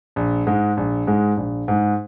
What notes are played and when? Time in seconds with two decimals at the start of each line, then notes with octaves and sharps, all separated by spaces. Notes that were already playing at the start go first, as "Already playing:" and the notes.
0.16 A#1
0.47 G#2 G#3
0.77 A#1
1.07 G#2 G#3
1.37 A#1
1.68 G#2 G#3